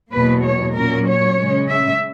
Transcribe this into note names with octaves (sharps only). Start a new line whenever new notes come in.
E2 B2 F#3 A#3 B4
C#5
A#2 F#3 A#3 C#4 A#4
C#5
C#3 G#3 C#4
E5